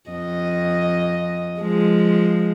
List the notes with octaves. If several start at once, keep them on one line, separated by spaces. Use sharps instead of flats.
F2 D#5
F3 G#3